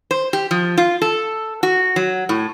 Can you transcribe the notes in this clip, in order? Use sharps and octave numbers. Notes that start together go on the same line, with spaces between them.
C5
G4
F3
F4
A4
F#4
F#3
A2